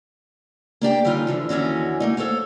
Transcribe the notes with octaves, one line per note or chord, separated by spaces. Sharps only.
A#3 D4 G4 G5
D3 G3 C#4 D#4 F4
D3 E3 F3
D#2 D3 E3 C#4 F#4
A3 A#3 D#4
A4 C5 C#5 F5